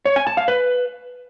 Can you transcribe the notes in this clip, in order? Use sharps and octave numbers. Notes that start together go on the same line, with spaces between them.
C#5
G#5
A5
F5
B4